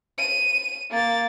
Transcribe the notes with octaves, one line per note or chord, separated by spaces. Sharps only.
D#7
A#3 A6